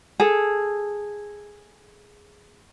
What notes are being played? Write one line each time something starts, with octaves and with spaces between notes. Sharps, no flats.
G#4 A4